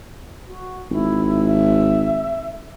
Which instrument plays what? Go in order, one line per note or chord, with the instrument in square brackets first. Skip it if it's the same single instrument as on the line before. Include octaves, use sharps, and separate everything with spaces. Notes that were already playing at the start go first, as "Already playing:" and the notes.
[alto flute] F#4
[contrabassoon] G#1 [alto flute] E4
[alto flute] E5